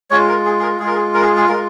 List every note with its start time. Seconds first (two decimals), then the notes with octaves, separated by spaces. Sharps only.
0.10 G#3 F4 C#5
0.28 A#4
0.45 G#4
0.59 G#4
0.62 A#4
0.79 G#3 F4 G#4
0.87 A#4
0.95 G#4
1.14 A#4
1.22 G#4
1.36 G#4
1.48 G#3 F4 A#4